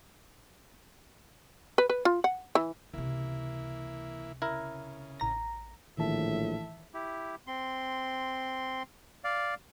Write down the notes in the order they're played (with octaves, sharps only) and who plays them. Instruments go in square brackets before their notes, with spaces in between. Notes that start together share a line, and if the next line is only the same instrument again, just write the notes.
[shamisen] B4
B4
F4
F#5
E3
[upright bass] C#2 C3 [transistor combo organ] E3 A#3 E4
[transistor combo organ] C#3 [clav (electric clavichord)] E4 A#4
[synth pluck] A1 A#5 A#6
[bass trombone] A#1 [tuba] A2 [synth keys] D#3 E3 A5 [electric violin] E5
[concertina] E4 G4
C4 C6
D5 F5